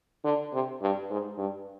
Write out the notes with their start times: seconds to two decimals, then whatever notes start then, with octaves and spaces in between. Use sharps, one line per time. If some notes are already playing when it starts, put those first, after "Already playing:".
0.25 D3
0.53 C3
0.81 G2
1.10 G#2
1.38 G2